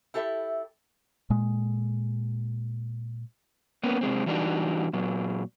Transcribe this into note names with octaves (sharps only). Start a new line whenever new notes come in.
E4 G4 A4 D5 E5
A#2 G#3
A#3 B3 C#4
C3 G#3 C4
E3 F#3 G3 D4 D#4 F#4
A#2 F#3